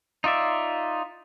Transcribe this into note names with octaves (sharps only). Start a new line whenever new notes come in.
D#4 F4 D5 E5